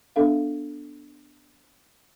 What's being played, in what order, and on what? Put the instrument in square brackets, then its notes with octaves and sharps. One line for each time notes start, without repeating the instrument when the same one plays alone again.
[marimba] B3 D4 A4 E5 F5